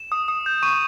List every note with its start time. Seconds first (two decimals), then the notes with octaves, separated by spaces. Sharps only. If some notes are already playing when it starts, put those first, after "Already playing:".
Already playing: E7
0.12 D#6
0.28 D#6
0.46 G6
0.63 C#6 D#7